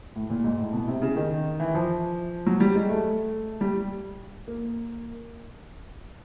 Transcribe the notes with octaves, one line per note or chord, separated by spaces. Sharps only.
A2
A#2
G#2
A2
B2
C3
C#3
D#3
E3
F3
F#3
G3
G#3
A3
G3
A#3